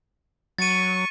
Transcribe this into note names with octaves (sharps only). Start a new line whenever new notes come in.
F#3 C#6 A6 D#7